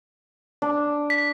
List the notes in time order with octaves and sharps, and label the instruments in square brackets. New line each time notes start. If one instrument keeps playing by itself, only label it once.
[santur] D4
[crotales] B6